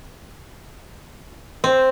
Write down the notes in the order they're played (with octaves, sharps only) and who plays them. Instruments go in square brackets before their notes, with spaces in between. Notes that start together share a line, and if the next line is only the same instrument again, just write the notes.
[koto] C4 [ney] C5